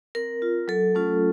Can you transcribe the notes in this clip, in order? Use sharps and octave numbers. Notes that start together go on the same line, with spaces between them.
C4 A#4
F4
F#3 A4
A3 C#4 F4